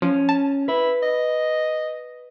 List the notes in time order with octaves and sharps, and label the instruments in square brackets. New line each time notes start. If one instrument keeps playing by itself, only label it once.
[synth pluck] F3 [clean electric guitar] C#4
[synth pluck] A5
[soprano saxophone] E4 [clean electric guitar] B4
[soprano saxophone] D#5